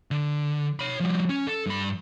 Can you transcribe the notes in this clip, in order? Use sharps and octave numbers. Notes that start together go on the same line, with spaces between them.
D3
C#5 B5
F3 G3
C#4
A4
G2 B5